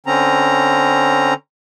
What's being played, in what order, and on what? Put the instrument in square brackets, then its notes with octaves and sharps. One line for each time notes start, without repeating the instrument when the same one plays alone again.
[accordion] D3 C4 C#4 A#5